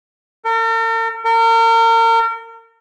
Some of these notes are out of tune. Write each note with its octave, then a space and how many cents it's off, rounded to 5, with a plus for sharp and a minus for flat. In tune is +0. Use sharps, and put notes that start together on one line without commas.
A#4 -45
A#4 -35